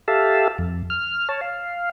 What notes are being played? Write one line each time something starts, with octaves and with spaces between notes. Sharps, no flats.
G4 A4 E5 F5 A5
F2
F6
C#5 A5
F5